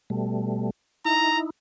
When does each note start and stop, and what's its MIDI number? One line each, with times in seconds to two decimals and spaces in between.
0.10 0.70 47
0.10 0.70 55
0.10 0.70 57
1.05 1.50 63
1.05 1.50 64
1.05 1.39 82